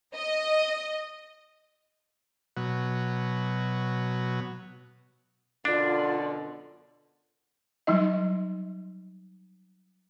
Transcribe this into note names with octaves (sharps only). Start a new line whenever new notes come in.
D#5
B2 F#3
F#2 B2 D3 D4 F4 D5
F#3 G3 D#4 D#5